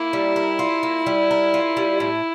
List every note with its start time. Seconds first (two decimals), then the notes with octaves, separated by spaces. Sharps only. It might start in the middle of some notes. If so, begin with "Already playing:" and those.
Already playing: A#3 E4
0.13 G3
0.36 A#4
0.59 F4
0.83 A#3
1.06 G3
1.31 A#4
1.54 F4
1.77 G3
2.00 A2